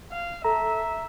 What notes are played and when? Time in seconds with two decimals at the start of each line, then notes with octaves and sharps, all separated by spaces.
0.12 F5
0.45 A4 E5 A#5